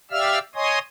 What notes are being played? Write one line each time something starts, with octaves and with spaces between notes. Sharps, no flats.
G4 D5 E5 F5 E6 F6
C#5 D#5 G#5 C6 D#6